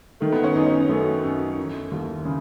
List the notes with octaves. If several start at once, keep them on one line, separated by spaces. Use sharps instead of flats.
D#3 A3
B3
C#4
F#2 D#4
C#4
F#2 A3
F#2
E3
D#2
C#3